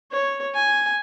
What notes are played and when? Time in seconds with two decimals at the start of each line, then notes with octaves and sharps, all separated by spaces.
0.12 C#5
0.55 G#5